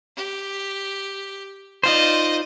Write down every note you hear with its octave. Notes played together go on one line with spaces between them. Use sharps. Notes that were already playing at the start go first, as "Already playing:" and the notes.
G4
D#4 F4 C5 D5 D#5